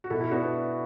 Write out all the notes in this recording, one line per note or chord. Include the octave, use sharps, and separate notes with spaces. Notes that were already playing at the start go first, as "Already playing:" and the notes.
F#4
B2 E4 A4
E4
B3 D4 F#4